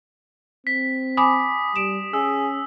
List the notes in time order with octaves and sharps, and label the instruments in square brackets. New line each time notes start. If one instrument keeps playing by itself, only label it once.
[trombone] C4 [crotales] B6
[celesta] G#5 B5 D6 [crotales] D#6
[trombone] G3 [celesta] D7 E7
[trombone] C#4 [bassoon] G#4 [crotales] E6